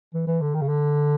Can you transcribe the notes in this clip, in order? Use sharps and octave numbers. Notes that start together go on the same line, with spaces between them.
E3
E3
D3
D#3
C#3
D3